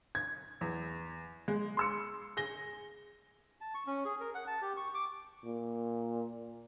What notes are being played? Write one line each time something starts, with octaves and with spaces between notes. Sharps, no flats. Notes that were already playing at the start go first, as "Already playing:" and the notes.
G#6
E2
G#3
C6 E6 C#7
G#4 A#6 G7
A5
C#6
C#4
G#4
A#4
F#5
A5
G4
C#6
D6
A#2